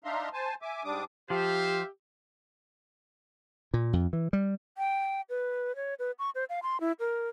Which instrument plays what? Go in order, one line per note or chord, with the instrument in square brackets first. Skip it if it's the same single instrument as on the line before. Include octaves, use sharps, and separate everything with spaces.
[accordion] D4 D#4 E5 F5 A#5 C6
C5 G#5 A5
E5 G#5 D6
G#2 G3 D4 D6 D#6
[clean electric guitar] F3 [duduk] G4 [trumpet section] C5 E5 F5
[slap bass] A#2
F2
E3
G3
[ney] G5
B4
C#5
B4
C#6
C5
F5
C6
E4
A#4